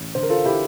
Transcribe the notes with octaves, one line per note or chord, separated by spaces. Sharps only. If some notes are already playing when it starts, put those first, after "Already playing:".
Already playing: A1
D3 C5
A#4
F4 A4
D3 E4 G4